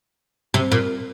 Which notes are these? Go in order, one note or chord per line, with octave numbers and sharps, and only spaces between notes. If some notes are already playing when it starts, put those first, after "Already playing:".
C3
A#2